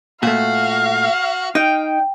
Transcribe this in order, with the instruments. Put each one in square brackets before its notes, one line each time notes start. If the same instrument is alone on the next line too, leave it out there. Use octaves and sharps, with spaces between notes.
[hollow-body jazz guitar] A#2 A3 [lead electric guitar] F#4 [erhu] F5
[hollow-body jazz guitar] D#4 [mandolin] G5